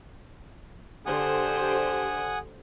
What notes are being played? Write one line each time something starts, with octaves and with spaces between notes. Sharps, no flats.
D3 G4 C5 F#5 G#5 D#6